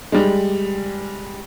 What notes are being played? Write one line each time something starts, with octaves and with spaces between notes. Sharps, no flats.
G3 G#3